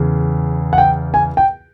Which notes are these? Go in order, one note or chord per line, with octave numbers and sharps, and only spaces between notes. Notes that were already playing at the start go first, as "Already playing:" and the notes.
Already playing: E2 C#3
F#5
G5
G#5
G5